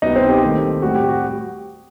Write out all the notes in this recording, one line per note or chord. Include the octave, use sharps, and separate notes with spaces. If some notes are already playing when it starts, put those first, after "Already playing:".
C2 B2 G3 B3 D#4 D#5
C4 C5
G4
D#2 D#3 A3 C4
A2 G3 C4 F#4
G4
F#4